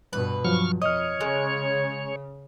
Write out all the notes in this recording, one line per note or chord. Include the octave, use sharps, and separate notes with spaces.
G2 B2 B4
G2 F3 F#3 C#6 F6
F2 C#5 D#5 D#6 F6
C#3 G#3